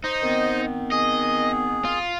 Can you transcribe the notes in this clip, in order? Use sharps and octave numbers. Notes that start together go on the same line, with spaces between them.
D#4 C5 D#5
D#3 B3 C4
G#4 D#5
F4